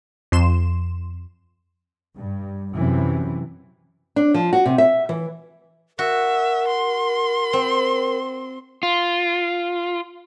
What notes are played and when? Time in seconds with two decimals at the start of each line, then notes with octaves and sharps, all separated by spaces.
0.32 F2 C6 E7
2.17 G2
2.74 F#2 C3 E3
4.16 D4
4.34 F3
4.53 F#4
4.66 C3
4.78 E5
5.09 E3
5.99 F#4 A#4 E5
6.67 C6
7.53 C4
8.83 F4